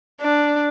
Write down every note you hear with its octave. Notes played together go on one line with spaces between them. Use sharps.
D4